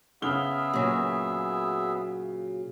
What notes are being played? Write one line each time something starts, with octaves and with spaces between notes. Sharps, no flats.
C#3 B3 G#4 E5 F6 G7
A#2 F#3